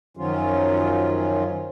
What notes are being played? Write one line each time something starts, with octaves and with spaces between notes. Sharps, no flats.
F#2 D#3 F3 F#3 C#4 F4